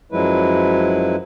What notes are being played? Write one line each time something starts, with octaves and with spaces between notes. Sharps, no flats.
F#2 F3 F#3 G#3 E4 B4